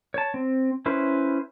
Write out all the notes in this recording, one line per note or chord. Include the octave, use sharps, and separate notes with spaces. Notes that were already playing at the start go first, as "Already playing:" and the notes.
C#5 A5
C4
C#4 E4 B4 C5